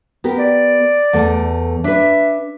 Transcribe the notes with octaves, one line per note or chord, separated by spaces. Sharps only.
B3 G4 A#4
D5
E2 A3
D4 B4 E5